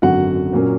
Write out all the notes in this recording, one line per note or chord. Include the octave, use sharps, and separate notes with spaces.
G#1 F#2 D3 F#3 F#4 F#5
A#2 F#3 A#3 C#4